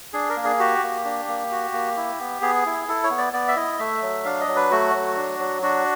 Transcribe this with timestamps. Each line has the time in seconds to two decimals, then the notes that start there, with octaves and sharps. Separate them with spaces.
0.13 D4 G#4
0.30 A#4
0.36 A#3
0.44 G#4
0.59 F#4 G4
0.83 A#3
1.05 D4
1.28 A#3
1.51 F#4
1.73 A#3
1.97 E4
2.20 B3
2.42 B3 G#4
2.66 E4
2.88 E4 A4
3.04 C#5
3.10 B3
3.18 D5
3.33 B3 D5
3.48 E5
3.56 E4 D#5
3.79 A3 E5
4.02 F#3
4.25 D4 F5
4.41 D#5
4.48 F#3
4.56 B4
4.71 A3 F#4
4.94 F#3
5.17 D4
5.39 F#3
5.62 D4 F#4